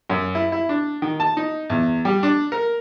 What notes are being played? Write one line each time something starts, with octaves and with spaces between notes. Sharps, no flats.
F#2
E4
E4
D4
D#3
A5
D#4
E2
G3
D4
A#4